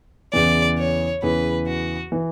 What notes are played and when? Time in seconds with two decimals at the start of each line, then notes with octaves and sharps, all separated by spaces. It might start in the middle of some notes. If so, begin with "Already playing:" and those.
0.33 E2 C#3 E3 D5
0.78 C#5
1.22 E2 C#3 E3 B4
1.67 F#4
2.12 E3